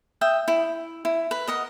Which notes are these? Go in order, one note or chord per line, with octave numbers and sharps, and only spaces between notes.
E5 G5 D#6
E4
E4
B4
A#4 D#5 F#5